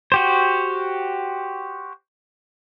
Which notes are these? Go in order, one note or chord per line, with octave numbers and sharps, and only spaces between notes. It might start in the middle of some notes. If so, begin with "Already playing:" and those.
F#4 G4 C5